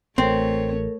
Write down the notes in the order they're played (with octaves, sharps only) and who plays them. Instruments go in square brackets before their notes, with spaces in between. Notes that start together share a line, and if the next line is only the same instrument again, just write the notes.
[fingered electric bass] A1 [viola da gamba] A3 C#5 [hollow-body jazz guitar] C4 [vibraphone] A4 A#4